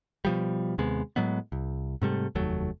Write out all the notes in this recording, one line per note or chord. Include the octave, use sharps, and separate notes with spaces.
B2 F3 G3
D#2 C3 G#3 B3
A2 F#3 G#3 B3
C2
G#2 C3 G3 A3
F1 D#2 F#3 A3